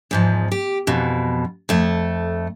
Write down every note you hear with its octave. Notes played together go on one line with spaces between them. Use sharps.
E2 G#2 F3
G4
F2 B2 E3
F2 A3